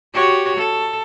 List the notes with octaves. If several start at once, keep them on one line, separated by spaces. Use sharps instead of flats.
F#4 G4 C#5
A4